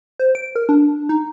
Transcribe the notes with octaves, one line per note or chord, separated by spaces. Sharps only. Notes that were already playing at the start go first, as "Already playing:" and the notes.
C5
D7
A#4
D4
D#4